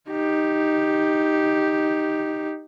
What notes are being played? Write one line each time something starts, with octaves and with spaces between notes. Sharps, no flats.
D#4 G4